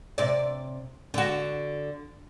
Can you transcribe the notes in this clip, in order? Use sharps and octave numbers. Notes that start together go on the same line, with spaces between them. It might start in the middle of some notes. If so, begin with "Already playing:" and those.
C3 D5
D3 F#4